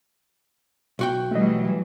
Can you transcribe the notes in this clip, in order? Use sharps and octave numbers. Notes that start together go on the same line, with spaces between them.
B1 F#4 G5
E3 F#3 G3 A3 D#5